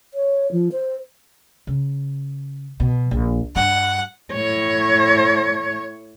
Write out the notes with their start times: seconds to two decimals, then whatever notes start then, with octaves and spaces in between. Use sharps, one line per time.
0.14 C#5
0.52 F3
0.72 C5
1.67 C#3
2.80 B2
3.11 A#1
3.56 G2 G3 F#5
4.32 A2 C#5